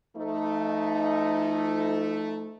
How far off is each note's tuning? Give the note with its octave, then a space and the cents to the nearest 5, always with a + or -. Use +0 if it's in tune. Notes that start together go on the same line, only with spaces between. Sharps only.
F3 -40 A3 +0 D#4 +0